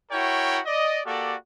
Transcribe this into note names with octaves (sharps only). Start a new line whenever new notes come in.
E4 F#4 A#4 C#5 G5
D5 D#5
A#3 F#4 G4 A4 D5